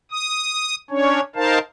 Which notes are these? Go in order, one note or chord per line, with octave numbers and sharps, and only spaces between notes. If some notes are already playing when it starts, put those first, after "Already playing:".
D#6
C#4 D4 C#5
D#4 A#4 C5 F5 A5